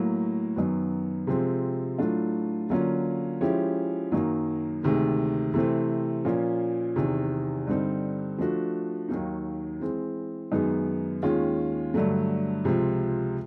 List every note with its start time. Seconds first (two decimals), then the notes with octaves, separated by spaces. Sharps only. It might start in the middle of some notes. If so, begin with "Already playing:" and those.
Already playing: A2 F#3 A#3
0.56 F#2 D#3 F#3 B3
1.27 C3 F3 G#3 C4
1.99 A2 F#3 A3 D4 F4
2.70 D3 F#3 A#3 C#4 F4
3.41 F3 G#3 C#4 E4 G4
4.12 F#2 D#3 F#3 A#3
4.83 D2 C3 D#3 G#3
5.54 C3 E3 A3 C4
6.25 A#2 F3 A#3 C#4 F4
6.96 E2 C3 D#3
7.67 G2 D3 G3 C4 D#4
8.38 F3 A3 D4 F#4
9.09 D#2 D#3 F#3 A#3 D#4
9.80 E3 G#3 C4
10.52 F#2 D#3 G#3 B3 D#4
11.22 D#2 D#3 G#3 C#4 F4
11.94 G2 D3 F#3 A3
12.64 C#2 C3 F3